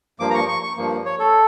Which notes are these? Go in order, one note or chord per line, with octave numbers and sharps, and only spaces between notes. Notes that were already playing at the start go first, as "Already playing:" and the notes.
G2 F3 A#3 D6
A#5
C#6
C#6
C#6
G2 F3 A#3
C#5
A4